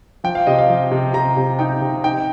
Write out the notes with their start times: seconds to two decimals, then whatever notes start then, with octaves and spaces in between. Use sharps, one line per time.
0.24 F3 G5
0.35 F5
0.47 C3 D#5
0.58 F5
0.69 F3
0.91 C3
1.14 C3 A#5
1.36 C3
1.59 D#4 G5
1.81 C3
2.04 D#4 G5